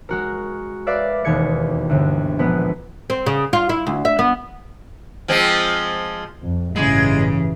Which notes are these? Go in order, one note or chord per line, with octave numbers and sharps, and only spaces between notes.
G#3 F#4 A#4
B4 D5 E5 F5
E1 D#2 G#3 B4 G#6 C#7
G1 D2
A#1 G#3 B3 B4
C4
C#3
F4
E4
D2
E5
B3
F3 G#3 C4
F2
A1 G2 C#3 E3 G#3